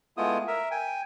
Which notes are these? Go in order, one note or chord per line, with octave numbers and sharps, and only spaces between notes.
G#3 A3 B3 E4 F4 D#6
A#4 E5
G5 G#5